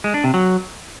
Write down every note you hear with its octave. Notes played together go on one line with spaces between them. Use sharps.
G#3
D4
C3
F#3